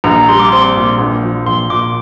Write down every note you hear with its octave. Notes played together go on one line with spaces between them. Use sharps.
A#1 A#5
G3 C6
D6
C4 C6
A#2
A#1
F3
A#1 C6
A#2 D6